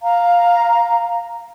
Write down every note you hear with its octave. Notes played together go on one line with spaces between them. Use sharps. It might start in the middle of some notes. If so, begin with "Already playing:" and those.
F5 A#5